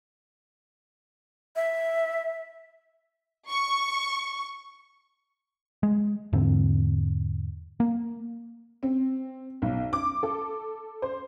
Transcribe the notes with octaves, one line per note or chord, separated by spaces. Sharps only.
E5
C#6
G#3
E2 G#2 D3 C4
A#3
C4
B1
D6
A4
C5